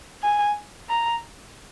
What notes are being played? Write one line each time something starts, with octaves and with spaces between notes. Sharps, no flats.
G#5
A#5